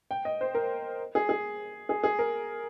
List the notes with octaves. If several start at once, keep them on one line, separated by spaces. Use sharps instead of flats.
G5
D#5
C5
A#4
G#4
G#4
G#4
G#4
A#4